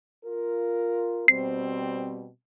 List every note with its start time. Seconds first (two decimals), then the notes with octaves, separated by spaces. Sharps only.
0.25 F4 A#4
1.28 B2 G3 C4 C7